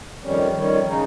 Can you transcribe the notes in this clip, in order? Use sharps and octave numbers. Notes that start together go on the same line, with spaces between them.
F2 D#3 G3 C#4
F2 D#3 G3 C#4
C#3 G#3 D#4